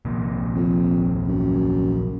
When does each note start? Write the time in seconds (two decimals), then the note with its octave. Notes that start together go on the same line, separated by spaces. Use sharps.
0.05 A#1 C3 A#3
0.56 F2
1.27 F#2